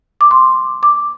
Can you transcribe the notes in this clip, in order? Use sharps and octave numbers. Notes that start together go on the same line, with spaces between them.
D6
C6
D6